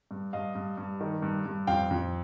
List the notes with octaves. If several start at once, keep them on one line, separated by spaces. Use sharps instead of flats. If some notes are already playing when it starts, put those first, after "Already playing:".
G2
G2 D#5 F5
G2
G2
D#3
G2
G2
F2 F5 G5
F2